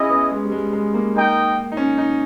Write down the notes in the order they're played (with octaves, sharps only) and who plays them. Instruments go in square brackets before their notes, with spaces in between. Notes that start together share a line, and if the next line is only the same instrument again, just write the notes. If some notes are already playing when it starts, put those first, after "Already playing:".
Already playing: [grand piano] C#4 [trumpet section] E4 G#4 D#5
[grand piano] B3
G#3
G3
G#3
G#3
A#3
[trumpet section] D#4 A#4 D#5 G5
[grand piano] D#4
C#4
D#4